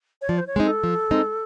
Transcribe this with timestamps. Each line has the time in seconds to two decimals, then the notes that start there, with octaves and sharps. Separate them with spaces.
0.22 C#5
0.29 F3 D5
0.38 C5
0.47 C#5
0.56 G#3 C4 D#4
0.65 A4
0.84 F3
1.11 G#3 C4 D#4